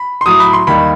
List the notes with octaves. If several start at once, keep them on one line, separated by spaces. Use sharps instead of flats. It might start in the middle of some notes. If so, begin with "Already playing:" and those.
Already playing: B5
C6
A2 F#3 D#6
B5
C6
D#2 D#3 G3 B5